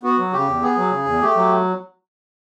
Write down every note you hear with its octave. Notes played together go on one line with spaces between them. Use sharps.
B3 F#4
F#3
C#3 G4
E2
B3 G#4
F#3
C#3
E2
A3 G4
F#3